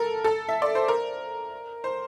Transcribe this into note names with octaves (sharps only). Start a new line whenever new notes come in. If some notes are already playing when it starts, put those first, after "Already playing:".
Already playing: A4 A#4
A4
E5
D5
C5
A#4
C5